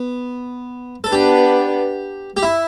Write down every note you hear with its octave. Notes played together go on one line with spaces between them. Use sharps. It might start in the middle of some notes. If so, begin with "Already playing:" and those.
Already playing: B3
A4
B3 D4 G4 B4
G4
E4